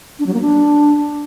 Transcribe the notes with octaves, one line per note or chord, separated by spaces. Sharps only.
D4
F#3
A#3
D4